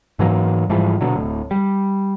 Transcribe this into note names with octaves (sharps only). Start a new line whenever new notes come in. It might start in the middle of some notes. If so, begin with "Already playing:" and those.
G#2 E3 F#3 A#3
G#2 E3 F3 G3
B2 D3 F#3
D1 A2
G3